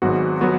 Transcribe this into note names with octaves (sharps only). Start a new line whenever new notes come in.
G#1 G#2 F#3 B3 F#4
F#3 B3 F#4